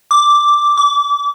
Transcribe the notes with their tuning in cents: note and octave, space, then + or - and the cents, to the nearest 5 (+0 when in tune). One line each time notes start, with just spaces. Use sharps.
D6 +0
D6 -25